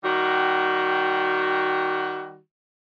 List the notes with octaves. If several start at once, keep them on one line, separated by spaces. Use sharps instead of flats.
D#3 G3 F#4